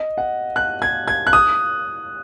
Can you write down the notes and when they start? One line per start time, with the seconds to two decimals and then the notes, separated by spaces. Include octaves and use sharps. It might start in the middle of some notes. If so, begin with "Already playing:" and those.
Already playing: D#5
0.18 F#5
0.56 F#6
0.82 G#6
1.08 G#6
1.27 F#6
1.33 D#6